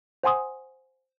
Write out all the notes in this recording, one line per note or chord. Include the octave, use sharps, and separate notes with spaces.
C5 F#5 G#5 C6 D#6